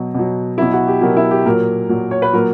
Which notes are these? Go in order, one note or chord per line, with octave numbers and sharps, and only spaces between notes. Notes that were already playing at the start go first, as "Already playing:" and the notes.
Already playing: B2 F#3
B2 F#3
B2 F#3 E4
F#4
G4
B2 F#3 A#4
E4
G4
A#2 F#3 A#4
A#2 F#3
C#5
B4
A#2 F#3 A#4